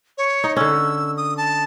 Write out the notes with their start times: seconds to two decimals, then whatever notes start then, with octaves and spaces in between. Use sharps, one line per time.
0.18 C#5
0.44 D#4
0.56 D3 C#4 E6
1.17 D#6
1.37 A5